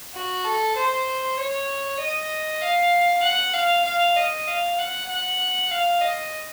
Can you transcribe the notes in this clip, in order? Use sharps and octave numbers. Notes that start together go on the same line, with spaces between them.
F#4
A4
C5
C#5
D#5
F5
F#5
F5
F5
D#5
F5
F#5
F#5
F5
D#5